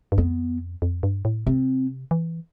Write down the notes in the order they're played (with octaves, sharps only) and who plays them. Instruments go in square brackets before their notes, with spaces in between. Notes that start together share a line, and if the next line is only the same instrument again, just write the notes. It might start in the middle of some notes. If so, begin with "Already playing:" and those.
[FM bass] G2
[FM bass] F2 [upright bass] B3
[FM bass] F2
G2
A2
[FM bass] C3 [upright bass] C4
[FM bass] E3